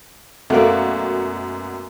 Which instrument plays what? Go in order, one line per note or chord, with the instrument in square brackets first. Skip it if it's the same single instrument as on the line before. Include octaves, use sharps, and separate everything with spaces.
[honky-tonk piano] F#2 B2 F#4 [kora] A3 A#3 D5